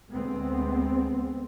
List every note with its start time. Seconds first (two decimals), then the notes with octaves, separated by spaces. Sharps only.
0.12 D2 G#3 B3 C4